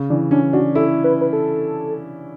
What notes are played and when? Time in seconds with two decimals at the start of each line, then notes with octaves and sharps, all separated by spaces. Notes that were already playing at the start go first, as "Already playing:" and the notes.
Already playing: C#3
0.10 E3 D4
0.31 C#4 D4
0.53 D4 F#4
0.75 E4 A4
1.04 B4
1.21 B4
1.33 A4